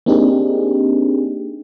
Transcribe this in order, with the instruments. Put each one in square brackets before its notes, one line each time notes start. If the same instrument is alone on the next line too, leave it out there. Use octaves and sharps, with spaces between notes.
[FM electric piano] A#3 C4 D4 D#4 G4 G#4